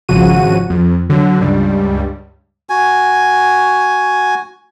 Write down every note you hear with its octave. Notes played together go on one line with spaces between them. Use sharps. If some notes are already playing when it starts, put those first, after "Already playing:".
G#1 C#3 F3 F#4 D#7
F2
D3 F#3
C#2 G2 G3
F#4 G#5